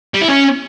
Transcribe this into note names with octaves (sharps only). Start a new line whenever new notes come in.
G3
E4
C#4